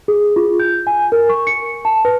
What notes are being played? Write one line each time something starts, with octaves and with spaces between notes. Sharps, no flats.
G#4
F4
G6
G#5
A#4
C#6
C#7
A5
B4